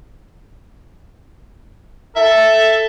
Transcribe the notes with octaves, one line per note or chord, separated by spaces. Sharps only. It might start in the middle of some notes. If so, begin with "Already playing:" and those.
A4 E5